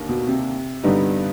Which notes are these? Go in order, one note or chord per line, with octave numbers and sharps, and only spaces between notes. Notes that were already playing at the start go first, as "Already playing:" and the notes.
Already playing: D#2 D3 A#3
B2
C3
G2 D3 G3 B3 D#4